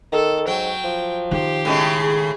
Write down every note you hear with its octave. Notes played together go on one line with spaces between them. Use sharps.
D#3 A4
G#2 F#3 G5
F3
D#3 G4 C6
A2 C#3 G#3
G#4